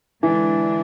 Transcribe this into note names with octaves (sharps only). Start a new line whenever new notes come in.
D3 E3 G#3 D4